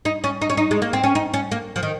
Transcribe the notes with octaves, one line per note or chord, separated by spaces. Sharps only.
D#4
C#4
D#4
C#4
D#4
G#3
A#3
C4
C#4
D#4
C#4
A#3
F3
D#3